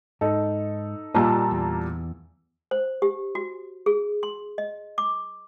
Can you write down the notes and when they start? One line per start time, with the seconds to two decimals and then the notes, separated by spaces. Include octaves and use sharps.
0.21 G#2 D#4 A4
1.15 A#2 G3 F4 D#5 A5 A#5 E6
1.51 E2
2.71 C5
3.02 G4
3.35 F#4
3.86 G#4
4.23 C6
4.58 D#5
4.98 D6